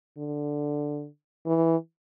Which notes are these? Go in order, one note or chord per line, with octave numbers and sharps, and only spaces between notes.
D3
E3